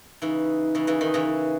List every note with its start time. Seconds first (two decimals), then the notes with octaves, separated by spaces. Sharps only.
0.22 C#3 E3 D#4
0.75 C#3 E3
0.87 C#3 E3
1.01 D#3
1.14 C#3 E3